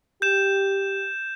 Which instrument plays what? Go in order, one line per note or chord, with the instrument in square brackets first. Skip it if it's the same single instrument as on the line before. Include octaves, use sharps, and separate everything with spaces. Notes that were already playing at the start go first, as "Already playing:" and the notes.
[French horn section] G4 [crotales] G6 E7